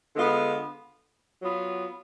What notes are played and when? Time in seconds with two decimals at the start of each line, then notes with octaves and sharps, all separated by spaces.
0.15 D3 G#3 B3 F4
1.41 F#3 B3 F4